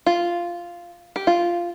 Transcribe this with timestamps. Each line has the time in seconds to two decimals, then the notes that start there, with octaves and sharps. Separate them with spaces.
0.06 F4
1.16 G4
1.27 F4